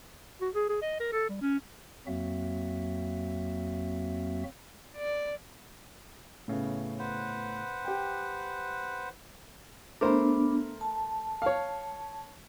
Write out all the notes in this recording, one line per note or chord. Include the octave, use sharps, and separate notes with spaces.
F#4
G#4
G#4
D#5
A#4
A4
G3
C#4
F2 F#3 A#3 C4 F#4 E5
D5
A2 C#3 B3
B4 C5 F#5
G4 G5
A3 B3 D4 A#4 C5
A5
C#5 F5